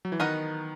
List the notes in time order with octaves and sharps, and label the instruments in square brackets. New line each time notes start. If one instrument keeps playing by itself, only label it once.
[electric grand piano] F#3
E3
[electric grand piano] D#3 [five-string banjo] B3 D#4 F#4 A#4 D#5